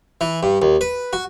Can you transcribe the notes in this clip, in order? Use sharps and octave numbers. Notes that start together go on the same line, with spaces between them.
E3
G2
D#2
B4
F#4